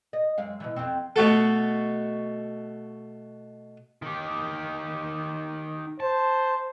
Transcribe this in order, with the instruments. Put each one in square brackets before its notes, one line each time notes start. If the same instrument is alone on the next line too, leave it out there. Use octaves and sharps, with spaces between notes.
[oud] D#5
F#2 G#3 F5
B2 D#3 E3
F2 C4
[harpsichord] B2 A3 F#4 A4
[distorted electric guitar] D#3 G4
[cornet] C5 [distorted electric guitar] A5